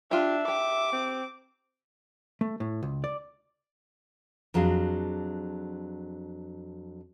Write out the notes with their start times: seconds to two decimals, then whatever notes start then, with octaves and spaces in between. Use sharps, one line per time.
0.11 D4 F4 G4 E5
0.48 G4 D6
0.92 C4
2.41 A3
2.60 A2
2.83 C#2
3.04 D5
4.54 F2 F#3 D4 G#4 F5